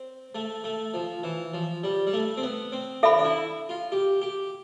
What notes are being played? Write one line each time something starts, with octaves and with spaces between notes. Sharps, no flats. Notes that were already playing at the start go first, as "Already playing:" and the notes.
Already playing: C4
A3
A3
F3
E3
F3
G3
G3
A3
C4
B3
C4
D4 A4 E5 B5
D4
E4
F4
G4
G4